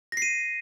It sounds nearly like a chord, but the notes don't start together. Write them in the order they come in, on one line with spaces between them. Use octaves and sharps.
A#6 C7 D#7